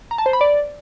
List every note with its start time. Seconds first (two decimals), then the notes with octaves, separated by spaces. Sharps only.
0.11 A#5
0.18 A5
0.26 C5
0.33 B5
0.41 D5